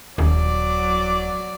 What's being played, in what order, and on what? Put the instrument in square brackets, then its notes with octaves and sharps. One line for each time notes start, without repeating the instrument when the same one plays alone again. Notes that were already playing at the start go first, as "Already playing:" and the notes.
[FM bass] D#1 [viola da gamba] F#3 D5